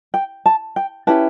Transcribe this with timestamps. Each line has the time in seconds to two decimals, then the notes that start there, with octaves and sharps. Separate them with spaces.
0.14 G5
0.46 A5
0.76 G5
1.07 C#4 E4 G4 B4 A5